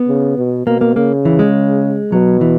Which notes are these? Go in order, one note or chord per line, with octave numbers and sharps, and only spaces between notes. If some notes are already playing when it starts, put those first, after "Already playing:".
Already playing: B3
C#3
B2
B2 A#3
A#3
C#3 A#3
E3
G#3
B2 F#3
E3